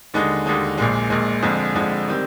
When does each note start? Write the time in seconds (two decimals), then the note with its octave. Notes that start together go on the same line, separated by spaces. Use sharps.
0.14 D#2 D3 G#3 D#4
0.46 D#2 D3 G#3 D#4
0.78 A#1 A#2 G#3
1.10 A#1 A#2 G#3
1.42 F2 D3 F3 G#3
1.75 F2 D3 F3 G#3
2.08 D#3 G3 C4